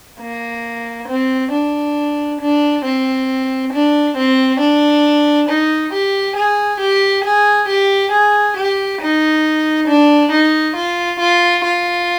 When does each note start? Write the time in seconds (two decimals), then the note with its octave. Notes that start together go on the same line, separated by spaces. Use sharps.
0.21 A#3
1.09 C4
1.52 D4
2.41 D4
2.85 C4
3.73 D4
4.17 C4
4.60 D4
5.49 D#4
5.93 G4
6.36 G#4
6.80 G4
7.25 G#4
7.69 G4
8.12 G#4
8.56 G4
9.01 D#4
9.88 D4
10.32 D#4
10.76 F4
11.20 F4
11.65 F4